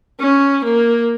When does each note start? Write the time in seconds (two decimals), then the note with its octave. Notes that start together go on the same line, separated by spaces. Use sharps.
0.20 C#4
0.64 A#3